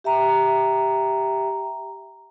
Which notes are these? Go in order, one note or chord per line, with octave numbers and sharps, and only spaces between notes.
G4 E5 G5 A#5